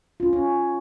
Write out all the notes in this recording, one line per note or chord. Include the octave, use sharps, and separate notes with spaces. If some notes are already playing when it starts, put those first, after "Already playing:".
C#4 F4
C#4